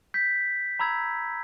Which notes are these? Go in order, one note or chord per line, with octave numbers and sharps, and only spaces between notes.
G6 B6
A#5 B5 E6 G#6